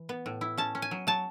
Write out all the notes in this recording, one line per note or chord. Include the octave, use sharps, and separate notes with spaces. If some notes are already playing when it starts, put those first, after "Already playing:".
Already playing: E3
B3
A2
E4
C#4 A5
C#4
G#5
F#3
F#3 A5